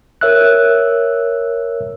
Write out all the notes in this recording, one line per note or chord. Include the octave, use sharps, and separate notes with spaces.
A#4 C#5 E5 E6 F#6